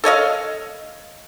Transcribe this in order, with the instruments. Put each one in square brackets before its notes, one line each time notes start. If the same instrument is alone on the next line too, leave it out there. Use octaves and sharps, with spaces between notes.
[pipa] A4 C#5 D#5 F5